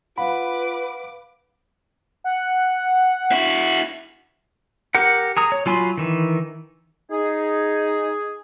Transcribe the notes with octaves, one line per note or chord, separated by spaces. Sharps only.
F4 B4 F5 F#5 B5 D6
F#5
E4 F#4
G4 A#4 F#5
G#4 A#5 D#6
C#5
F#3 F4 G#5 B5 C6
D#3 E3
D#4 G#4